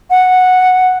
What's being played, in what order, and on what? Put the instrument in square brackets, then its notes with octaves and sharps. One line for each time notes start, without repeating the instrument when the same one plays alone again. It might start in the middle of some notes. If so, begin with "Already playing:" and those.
[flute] F#5